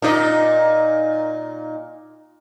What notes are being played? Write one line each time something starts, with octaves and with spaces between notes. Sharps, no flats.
A#2 D#4 D#5